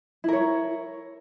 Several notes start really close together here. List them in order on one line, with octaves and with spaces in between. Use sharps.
E4 A#4 C#5